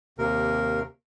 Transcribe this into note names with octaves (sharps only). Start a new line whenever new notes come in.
D#2 C3 A#4